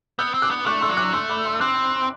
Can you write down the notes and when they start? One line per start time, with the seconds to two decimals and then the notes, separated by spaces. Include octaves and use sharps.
0.19 B3 E6 G6
0.34 C4
0.42 D6 F#6
0.50 B3
0.66 A3 D6 F#6
0.81 C6 E6
0.89 F#3
0.97 D6 F#6
1.13 A3 C6 E6
1.29 B5 D6
1.45 C6 E6
1.60 C4 D6 F#6